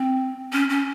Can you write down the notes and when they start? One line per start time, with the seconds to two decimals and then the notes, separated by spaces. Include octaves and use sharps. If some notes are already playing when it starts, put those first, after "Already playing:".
Already playing: C4
0.53 C#4
0.70 C#4